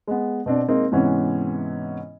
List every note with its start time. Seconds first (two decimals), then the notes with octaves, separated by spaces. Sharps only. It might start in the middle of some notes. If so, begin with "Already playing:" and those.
0.08 G#3 B3
0.46 B2 C4 D4
0.68 G#3 A#3 C4 D#4
0.91 G#2 C3 E3 B3 C#4 E4